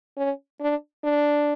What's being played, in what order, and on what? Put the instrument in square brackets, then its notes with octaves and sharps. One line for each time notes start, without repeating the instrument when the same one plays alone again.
[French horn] C#4
D4
D4